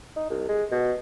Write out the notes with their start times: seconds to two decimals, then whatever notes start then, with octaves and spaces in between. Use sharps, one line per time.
0.16 D#4
0.30 C2
0.49 G#3
0.72 B2